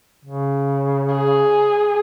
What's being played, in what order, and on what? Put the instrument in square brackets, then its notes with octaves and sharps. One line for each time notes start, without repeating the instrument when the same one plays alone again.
[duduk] C#3
[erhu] G#4